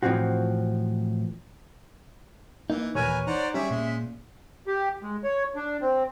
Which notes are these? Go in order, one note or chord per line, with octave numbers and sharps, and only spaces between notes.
A2 E3 F3 C4 F#4
E3 A#3 D#4
D#2 A#2 E3 A#4 B4 C#5 G#5
D#4 C5 D5 F#5 A#5
G3 C#4 G#4 C#5 D5 E5
A#2 G#3
G4
G#3
C#5
D4
C4